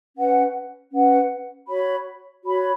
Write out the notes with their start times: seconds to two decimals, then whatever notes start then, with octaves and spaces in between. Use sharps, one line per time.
0.17 C#4 B4 F#5
0.92 C#4 B4 F#5
1.69 F#4 C#5 B5
2.44 F#4 C#5 B5